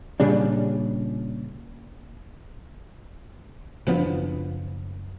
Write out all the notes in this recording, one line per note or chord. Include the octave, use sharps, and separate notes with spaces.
A#2 C#3 G3 D4
F#1 F3 B3 D4